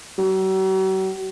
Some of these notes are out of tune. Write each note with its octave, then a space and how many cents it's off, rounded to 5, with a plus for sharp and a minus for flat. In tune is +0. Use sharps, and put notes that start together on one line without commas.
F#3 +45